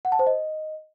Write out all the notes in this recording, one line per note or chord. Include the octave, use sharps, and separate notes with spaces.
F#5
A5
C5
D#5